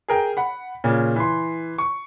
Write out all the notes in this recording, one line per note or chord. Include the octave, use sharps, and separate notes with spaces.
G#4 A#4 G5
F#5 B5
A#2 C#3
E3 C6
C#6